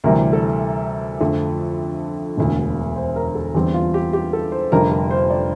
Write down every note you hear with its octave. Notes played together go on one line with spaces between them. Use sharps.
D2 C3 E3 G3 A#4
A4
F2 D3 F3 A3
E1 D2 D3
C5
A#4
A4
E2 D3 G3 C4 G4
F4
G4
G4
A4
C5
F1 F2 D3 G3 A#4
A#4
C5
D5